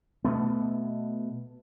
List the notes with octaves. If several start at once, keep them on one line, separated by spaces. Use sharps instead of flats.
B2 A3 B3